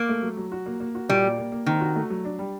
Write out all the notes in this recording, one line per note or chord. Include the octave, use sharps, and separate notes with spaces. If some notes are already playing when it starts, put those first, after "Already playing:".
Already playing: A#3
A3
F#3
F#3
F#4
A#3
A#3
F#4
A#2 G3
A#3
A#3
A#3
D#3 C4
F#4
A3
F#3
D4
G3